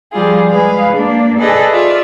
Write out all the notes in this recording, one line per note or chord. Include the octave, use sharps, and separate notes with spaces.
F3 G3 F4 G#4
G#3 G#4 B4 F5
A#3 D4
G#4 A4 B4 D5 D#5
F4 D5 E5